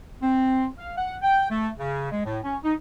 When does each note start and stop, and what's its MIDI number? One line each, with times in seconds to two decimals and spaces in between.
0.21 0.65 60
0.78 0.97 77
0.97 1.15 78
1.22 1.49 79
1.50 1.67 57
1.79 2.07 49
2.11 2.22 56
2.24 2.38 45
2.43 2.56 61
2.63 2.73 63